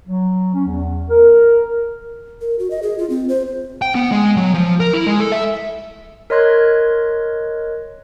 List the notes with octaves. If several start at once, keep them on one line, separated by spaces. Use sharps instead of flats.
F#3
C#4
E2
A#4
A#4
F#4
D#5
G#4
F4
C4
C5
G5
B3
G#3
F#3
F3
A#4
E4
G#3
A4
E5
A#4 C#5 D#5 C6 F#6 G#6